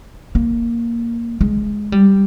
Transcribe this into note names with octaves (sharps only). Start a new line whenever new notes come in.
A#3
G#3
G3